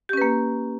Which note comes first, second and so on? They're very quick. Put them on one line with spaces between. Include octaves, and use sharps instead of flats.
G4 C#4 B4 A#3